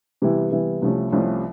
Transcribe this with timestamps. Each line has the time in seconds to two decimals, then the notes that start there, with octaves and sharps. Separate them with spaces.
0.22 C3 E3 G3 B3 E4
0.51 C3 E3 G3 B3 E4
0.82 C2 C3 F3 A3 C#4
1.12 C2 C3 F3 A3 C#4